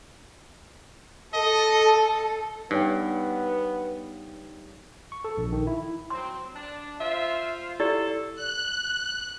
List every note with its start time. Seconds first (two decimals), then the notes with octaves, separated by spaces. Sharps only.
1.34 A4 D#5
2.71 G2 B3 D#4 C#5 G5
5.12 C#6
5.24 A4
5.38 A#1
5.52 D#3
5.67 E4
6.10 F#3 C4 C6
6.54 D4
7.00 F4 C5 E5 F5
7.80 E4 G4 A4 D5
8.36 F#6